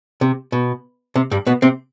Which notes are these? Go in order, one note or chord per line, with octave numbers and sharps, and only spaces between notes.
C3
B2
C3
G2 G3
B2 B3
C3 C4